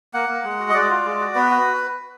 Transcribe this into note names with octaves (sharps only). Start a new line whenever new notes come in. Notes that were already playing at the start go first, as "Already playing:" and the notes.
A#3 F#5
A#3
G#3
F#4
D#5
G#3 D5
F4
G#3
F#4
B3 B4
F#4